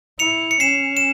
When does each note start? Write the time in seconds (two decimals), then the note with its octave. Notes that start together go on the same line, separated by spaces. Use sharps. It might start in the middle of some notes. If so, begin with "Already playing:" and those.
0.19 E4 C#7 F7
0.51 C#7
0.60 C#4 C7 E7
0.97 E7